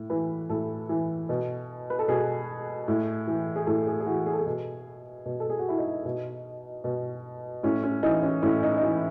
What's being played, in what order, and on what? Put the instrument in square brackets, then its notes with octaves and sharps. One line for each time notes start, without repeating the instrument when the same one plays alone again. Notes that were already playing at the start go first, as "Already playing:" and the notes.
Already playing: [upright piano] A2
E3 B4
A2 A4
E3
B2
B4
A4
B2 G#4
A2
E3
G#4
A2 A4
G#4
G#4
E3 F#4
G#4
A4
G#4
B2
B2
A4
G#4
F#4
E4
D#4
B2
B2
A2 C#4
C#4
E3 D#4
C#4
A2 C#4
D#4
D#4
E3 E4